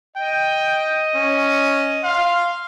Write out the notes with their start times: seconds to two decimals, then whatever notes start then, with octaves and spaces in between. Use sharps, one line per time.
0.16 D#5 G5
1.15 C#4
2.04 F5 C6